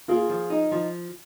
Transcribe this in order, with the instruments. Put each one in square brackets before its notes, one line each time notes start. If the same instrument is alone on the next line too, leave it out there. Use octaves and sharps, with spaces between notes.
[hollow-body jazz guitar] A#3 [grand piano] F4 G#4
[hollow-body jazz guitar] F3
D#4
F3